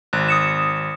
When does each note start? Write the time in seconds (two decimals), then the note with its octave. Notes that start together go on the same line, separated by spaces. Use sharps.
0.13 G#1 F#6
0.28 D#6 C#7 E7